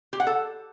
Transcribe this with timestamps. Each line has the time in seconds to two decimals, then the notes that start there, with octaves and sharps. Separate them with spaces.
0.13 G4
0.20 F#5
0.27 A4